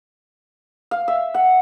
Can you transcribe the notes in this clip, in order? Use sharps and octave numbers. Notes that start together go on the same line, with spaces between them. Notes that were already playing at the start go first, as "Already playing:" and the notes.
F5
E5
F#5